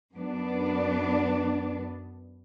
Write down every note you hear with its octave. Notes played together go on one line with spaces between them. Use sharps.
F#2 B3 D4